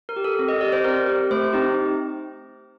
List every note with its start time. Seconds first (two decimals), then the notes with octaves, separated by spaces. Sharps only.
0.09 A#4
0.16 G4
0.24 A4
0.39 C4
0.48 D#5
0.61 G4 D5
0.73 C5
0.84 C4 A#4
1.07 G4
1.31 A3 C5
1.53 C4 D#4 G4